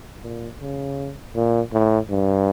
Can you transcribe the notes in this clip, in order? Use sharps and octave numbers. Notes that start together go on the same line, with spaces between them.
A#2
C#3
A#2
A2
G2